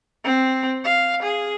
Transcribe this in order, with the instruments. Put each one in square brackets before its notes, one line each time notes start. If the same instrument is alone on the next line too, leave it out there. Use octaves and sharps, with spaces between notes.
[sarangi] C4
F5
G#4